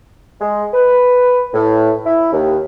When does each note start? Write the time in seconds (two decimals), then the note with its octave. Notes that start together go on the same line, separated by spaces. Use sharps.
0.41 G#3
0.73 B4
1.54 A2
2.06 E4
2.32 D#2